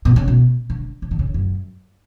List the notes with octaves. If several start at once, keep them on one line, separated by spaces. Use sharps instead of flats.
B2
C#3
B2
D3
C#3
D3
C#3
F#2